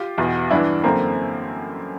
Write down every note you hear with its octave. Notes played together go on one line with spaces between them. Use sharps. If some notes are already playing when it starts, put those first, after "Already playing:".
Already playing: F4 G4
E2 B2
G2 E3 D4 E4
F#2 D3 A#3 C4